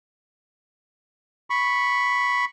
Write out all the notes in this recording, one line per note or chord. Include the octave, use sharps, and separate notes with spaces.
B5 C#6